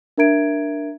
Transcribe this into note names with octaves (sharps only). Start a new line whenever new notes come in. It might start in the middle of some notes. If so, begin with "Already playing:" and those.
D4 A#4 E5 A#5 G#6 D7